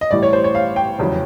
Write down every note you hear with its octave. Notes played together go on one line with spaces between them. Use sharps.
D#5
A1 A2 E3 G3 D5
C#5
C5
C#5
F5
G5
F1 E2 C#3 F#3 B3